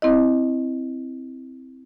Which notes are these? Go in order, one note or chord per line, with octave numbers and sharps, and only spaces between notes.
C4 E4 D#5